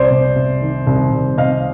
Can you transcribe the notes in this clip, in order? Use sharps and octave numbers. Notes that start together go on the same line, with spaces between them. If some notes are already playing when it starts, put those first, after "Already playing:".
Already playing: C2 C5 D5
C3
C3
D#3
C2
C2
C3 D#5 F5